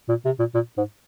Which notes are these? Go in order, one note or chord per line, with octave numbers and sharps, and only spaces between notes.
A#2
C3
A#2
A#2
G#2